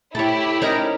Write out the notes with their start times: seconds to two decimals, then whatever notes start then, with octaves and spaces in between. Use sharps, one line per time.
0.15 E4 G4 A4 C#5
0.62 C#4 D#4 A#4